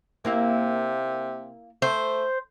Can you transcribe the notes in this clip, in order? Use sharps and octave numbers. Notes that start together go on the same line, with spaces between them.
C3 A#3 E4 F5
A3 C5